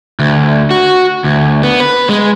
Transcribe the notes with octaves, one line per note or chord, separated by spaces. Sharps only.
D2
F#4
D2
B3
B4
G#3